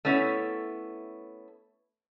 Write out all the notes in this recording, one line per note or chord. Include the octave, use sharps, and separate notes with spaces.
A3 B3 C#4 E4